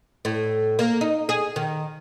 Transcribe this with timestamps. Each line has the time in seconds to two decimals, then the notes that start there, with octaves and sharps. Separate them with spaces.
0.25 A2
0.79 A#3
1.01 D#4
1.29 G#4
1.56 D#3